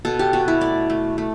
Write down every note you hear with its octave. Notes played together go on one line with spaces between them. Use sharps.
B2 A4
G4
B2 F#4
E4
A3 D5
A3
A3